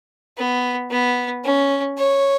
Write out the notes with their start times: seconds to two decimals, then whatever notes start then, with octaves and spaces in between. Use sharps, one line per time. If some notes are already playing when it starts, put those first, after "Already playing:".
0.38 B3
0.91 B3
1.44 C#4
1.98 C#5